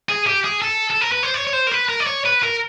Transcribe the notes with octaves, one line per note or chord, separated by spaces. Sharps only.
G#4
G4
G#4
A4
A4
A#4
B4
C5
C#5
C#5
C5
A#4
B4
A#4
D5
C#5
B4
A#4